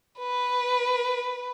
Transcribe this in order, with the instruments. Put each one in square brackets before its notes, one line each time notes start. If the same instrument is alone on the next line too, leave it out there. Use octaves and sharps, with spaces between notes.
[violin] B4